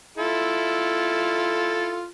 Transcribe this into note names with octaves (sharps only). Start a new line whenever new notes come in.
E4 F4 A4